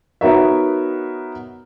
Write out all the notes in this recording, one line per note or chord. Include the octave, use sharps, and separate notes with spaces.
B3 D#4 F#4 A#4 C#5 E5